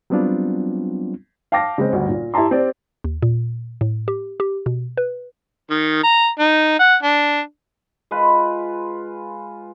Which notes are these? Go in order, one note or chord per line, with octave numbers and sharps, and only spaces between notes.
F#3 G3 B3 C4 D4 F4
F5 G5 A5 D6 A#6
C#3 G#3 C4
G1 D2
A#2
E4 G4 A5 A#5 C6
C4 G4 D5
D#2
A#2
A2
G4
G4
B2
B4
D#3
A#5
D#4
F#5
D4
G#3 F4 B4 B5